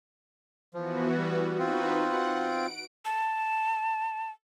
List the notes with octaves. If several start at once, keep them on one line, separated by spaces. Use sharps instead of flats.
E3 F3 B3 F#4
G3
C4 D#4 F4 F#4 B4
F#5
D7
A5